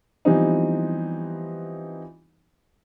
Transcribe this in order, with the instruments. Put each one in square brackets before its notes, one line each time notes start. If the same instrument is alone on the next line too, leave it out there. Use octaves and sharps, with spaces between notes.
[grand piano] E3 F3 G3 B3 C4 D#4